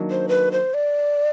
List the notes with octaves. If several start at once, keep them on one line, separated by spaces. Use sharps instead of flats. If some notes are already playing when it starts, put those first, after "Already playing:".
Already playing: D#3 F#3 A#3 D4 F#4
C5
B4
C5
D5